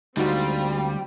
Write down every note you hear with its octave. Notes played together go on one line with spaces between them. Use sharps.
D2 G3 G#3 C4 D#4 F4 F#4